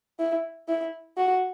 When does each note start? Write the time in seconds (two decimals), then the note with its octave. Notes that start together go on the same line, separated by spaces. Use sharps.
0.19 E4
0.68 E4
1.17 F#4